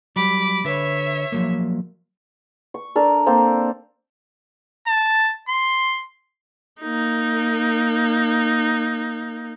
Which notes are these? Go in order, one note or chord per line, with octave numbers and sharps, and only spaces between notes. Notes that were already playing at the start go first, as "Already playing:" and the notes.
F#3 G3 B5 D6
D3 B4 C#5 E5
F3 F#3 A#3
C#6
D4 A4 A#4
A#3 C4 A4 C5
A5
C6
A#3 D#4